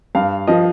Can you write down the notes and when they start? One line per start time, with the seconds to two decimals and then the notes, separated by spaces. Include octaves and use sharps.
0.15 G2 F5
0.47 F3 D#5